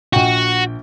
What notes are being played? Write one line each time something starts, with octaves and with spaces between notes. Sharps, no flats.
A#1 F#4 G5